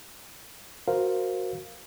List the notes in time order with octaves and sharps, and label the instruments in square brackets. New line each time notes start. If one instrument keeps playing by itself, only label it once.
[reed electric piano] F#4 A#4 C5 F5